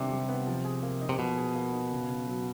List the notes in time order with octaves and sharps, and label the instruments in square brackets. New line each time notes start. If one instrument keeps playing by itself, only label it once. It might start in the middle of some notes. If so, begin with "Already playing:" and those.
Already playing: [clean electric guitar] C3 [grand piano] D#3 G3 B3 D4
[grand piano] G3
B3
F3
G#4
A#3
D#4
[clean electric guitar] C3
[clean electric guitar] B2 [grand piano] F3
[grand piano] G#4
A#3
D#4
C#3
C#3
F#3